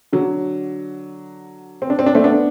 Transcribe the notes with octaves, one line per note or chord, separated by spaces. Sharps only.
D3 F#3
C4
D4
C4
D4
A3 C4
B3 D4